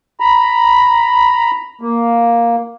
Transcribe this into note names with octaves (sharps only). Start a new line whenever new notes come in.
A#5 B5
A#3